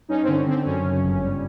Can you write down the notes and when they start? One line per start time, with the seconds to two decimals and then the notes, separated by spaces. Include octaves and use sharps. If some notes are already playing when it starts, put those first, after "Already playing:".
0.09 G2 C#4 D#4
0.23 C4
0.27 D3 C#4
0.46 D3 C4
0.64 F#2 C#4
0.84 C#3
1.03 G1
1.22 G3